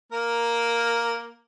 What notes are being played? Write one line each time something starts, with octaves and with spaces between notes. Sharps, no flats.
A#3 A#4